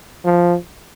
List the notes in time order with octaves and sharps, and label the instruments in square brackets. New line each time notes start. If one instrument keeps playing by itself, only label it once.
[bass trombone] F3